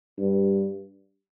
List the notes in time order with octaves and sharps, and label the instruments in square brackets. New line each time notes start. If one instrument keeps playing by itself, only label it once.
[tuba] G2